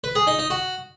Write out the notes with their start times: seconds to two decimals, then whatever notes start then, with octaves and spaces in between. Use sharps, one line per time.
0.04 B4
0.15 G#4
0.27 D#4
0.39 D#4
0.50 F#4